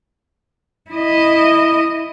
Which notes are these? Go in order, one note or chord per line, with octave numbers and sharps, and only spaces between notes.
E4 D#5